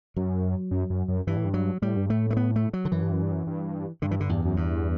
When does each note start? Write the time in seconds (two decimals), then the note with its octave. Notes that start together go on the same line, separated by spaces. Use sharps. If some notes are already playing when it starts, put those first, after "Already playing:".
0.16 F#2 F#3
0.71 F#2
0.90 F#2
1.08 F#2
1.27 G2 E3
1.37 A2
1.45 G2
1.54 F#3
1.82 A2 G3
1.96 G2
2.09 A2 A3
2.30 A3
2.37 B3
2.56 A3
2.73 F#3
2.85 D3
2.92 F#2 E3
3.02 G2
3.12 F#2
3.22 G2
3.32 F#2
3.47 G2
4.02 G2 D3
4.11 E3
4.20 D3
4.29 E2
4.45 F#2
4.57 E2 G2